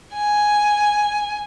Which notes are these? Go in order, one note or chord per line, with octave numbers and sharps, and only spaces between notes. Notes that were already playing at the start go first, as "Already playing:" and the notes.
G#5